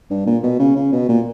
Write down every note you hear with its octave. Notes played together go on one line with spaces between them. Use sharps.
G2
A#2
B2
C#3
C#3
B2
A#2